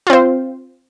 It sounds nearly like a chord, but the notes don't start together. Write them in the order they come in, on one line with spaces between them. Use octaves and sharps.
F4 C4 C5